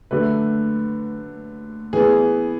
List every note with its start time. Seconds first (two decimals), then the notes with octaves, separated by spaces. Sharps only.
0.11 D3 F#3 A3 B4
1.93 E3 B3 G#4